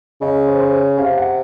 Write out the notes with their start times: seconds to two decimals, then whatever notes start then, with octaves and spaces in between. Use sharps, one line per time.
0.21 C#3 D#5
0.47 C5
0.60 C5
0.73 C#5
0.98 C3 F5
1.18 F#5